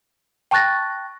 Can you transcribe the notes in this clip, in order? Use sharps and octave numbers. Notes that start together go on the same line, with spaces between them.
G5 A5 C#6 F#6 A6 A#6